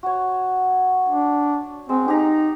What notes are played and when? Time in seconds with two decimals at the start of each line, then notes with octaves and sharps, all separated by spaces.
0.03 F#4 C#5
1.09 D4
1.89 G#3 C4
2.08 D#4 G4 A#5